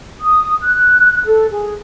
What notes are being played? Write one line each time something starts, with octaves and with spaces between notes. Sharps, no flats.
D#6
F#6
A4
G#4